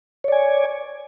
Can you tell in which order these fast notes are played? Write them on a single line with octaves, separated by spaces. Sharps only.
C#5 D5 G#5